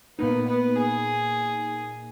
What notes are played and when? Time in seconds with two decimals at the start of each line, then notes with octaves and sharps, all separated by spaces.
0.19 A#2 A#3 B3 D#4
0.47 B3
0.76 G#4